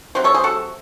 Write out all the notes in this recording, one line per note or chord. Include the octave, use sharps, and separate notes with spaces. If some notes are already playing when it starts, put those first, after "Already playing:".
C3 F#3 C5
A4 C#5
G#4 C5
F#4 A4